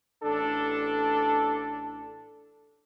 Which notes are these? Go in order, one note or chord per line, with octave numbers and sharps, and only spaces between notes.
A1 D4 A4